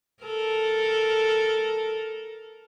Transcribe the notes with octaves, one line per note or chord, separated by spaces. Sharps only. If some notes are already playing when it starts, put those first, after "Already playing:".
A4 A#4